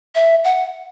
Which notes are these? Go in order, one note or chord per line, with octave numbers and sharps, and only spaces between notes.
E5
F#5